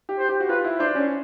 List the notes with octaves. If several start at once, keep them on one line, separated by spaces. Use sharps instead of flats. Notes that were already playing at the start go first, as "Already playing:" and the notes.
G4
C5
G4
F#4
F4 B4
E4
D4 C5
C#4